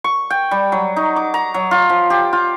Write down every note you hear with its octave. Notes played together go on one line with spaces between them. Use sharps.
C#6
G5
G3
F#3
D#4
D6
A#5
F#3
F4
F3
G4
F4